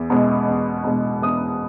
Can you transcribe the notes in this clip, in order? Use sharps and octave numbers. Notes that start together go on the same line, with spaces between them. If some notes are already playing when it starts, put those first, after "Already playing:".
Already playing: E2
B2 G#3
E2
B2 G#3
E2 D#6